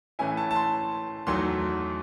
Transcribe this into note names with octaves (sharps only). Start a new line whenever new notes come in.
A2 E3 A3 C#4 E4 G#5
A5
A5
C6
E2 D#3 F#3 A3 C6